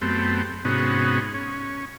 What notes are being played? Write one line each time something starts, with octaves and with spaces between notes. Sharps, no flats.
F#2 A3 B3 C4 G4
G#2 C3 B3 C#4 D#4 F#4
C#4